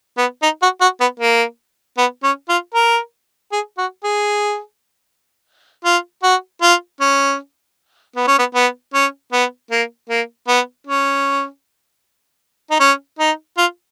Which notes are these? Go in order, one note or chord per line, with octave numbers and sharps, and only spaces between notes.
B3
D#4
F#4
F#4
B3
A#3
B3
C#4
F4
A#4
G#4
F#4
G#4
F4
F#4
F4
C#4
B3
C#4
B3
B3
C#4
B3
A#3
A#3
B3
C#4
D#4
C#4
D#4
F4